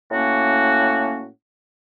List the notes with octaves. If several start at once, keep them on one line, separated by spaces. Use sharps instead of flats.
A2 A#3 C#4 F#4